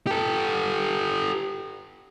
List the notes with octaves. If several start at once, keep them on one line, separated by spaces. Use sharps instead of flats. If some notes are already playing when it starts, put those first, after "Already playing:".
G4 A4